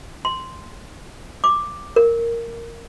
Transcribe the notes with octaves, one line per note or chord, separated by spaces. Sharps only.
C6
D6
A#4